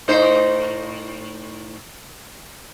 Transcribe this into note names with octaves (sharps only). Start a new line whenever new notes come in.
A2 D#4 C5